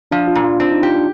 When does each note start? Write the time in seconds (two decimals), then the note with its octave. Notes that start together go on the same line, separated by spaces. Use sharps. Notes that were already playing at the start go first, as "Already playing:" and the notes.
0.11 F3 D4
0.28 F4
0.35 A#2
0.44 F4
0.60 C4 D4
0.71 D#4
0.82 F4 G4
0.95 D4